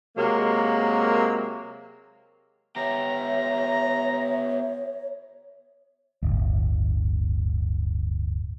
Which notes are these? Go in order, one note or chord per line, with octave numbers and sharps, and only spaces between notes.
C3 F#3 G#3 A#3
B3 G4 C#5 E5 A#5
D1 G1